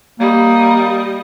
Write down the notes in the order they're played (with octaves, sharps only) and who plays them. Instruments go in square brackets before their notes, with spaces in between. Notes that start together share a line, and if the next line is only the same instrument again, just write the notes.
[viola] G3 D#5 [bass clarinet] A#3